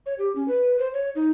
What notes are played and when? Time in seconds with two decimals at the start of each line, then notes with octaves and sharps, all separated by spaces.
0.06 C#5
0.18 G4
0.35 C#4
0.48 B4
0.79 C5
0.93 C#5
1.15 D#4